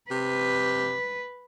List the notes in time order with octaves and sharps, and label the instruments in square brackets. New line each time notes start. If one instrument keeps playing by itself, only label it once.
[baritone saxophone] C3 [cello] B4